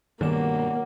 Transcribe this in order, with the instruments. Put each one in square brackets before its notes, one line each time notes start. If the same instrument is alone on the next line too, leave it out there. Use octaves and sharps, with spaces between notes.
[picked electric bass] G2 B2 [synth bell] D#3 E7 [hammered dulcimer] F#3 F#5 D6 [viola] A#3